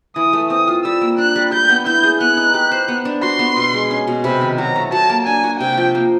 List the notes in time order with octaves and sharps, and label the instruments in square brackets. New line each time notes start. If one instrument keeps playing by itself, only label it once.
[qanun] E3 [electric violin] D#6
[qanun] A3
[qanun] C4 [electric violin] D#6
[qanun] F4
[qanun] G3 [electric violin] E6
[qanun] A#3
[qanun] D4 [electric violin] F#6
[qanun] G3
[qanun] G3 [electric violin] G6
[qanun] B3
[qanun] E4 [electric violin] G6
[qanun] G#4
[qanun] B3 [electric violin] F#6
[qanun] D#4
G4
C5
B3
D4
[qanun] F#4 [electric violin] C6
[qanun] B3
B2
G#3
C#4
B2
[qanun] C3 [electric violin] B5
[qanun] D#3
[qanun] F#3 [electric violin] A#5
[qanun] A3
[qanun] F#3 [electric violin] A5
[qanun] A#3
[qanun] D4 [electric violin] G#5
[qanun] F#4
[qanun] C3 [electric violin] G5
[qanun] F3
A#3